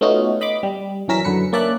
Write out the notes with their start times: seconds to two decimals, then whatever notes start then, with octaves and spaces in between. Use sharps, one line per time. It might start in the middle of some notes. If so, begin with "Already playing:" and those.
0.01 A3 B3 C#4 D#4 F4 F#4
0.41 D#5 B5 C6 D6
0.63 G3
1.08 F#2 E3 C#4 A#4 E6 B6
1.24 F#2 D3 B4 C#7
1.53 A#3 C#4 D5 E5 A5 F#6